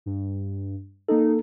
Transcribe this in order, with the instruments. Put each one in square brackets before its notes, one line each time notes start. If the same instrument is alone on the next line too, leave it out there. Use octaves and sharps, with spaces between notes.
[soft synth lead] G2
[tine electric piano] A#3 A4 [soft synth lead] D#4